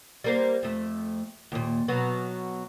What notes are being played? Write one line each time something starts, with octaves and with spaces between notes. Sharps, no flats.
G3 A#3 C5
F2 A3
D#2 A#2
B2 F#3 B3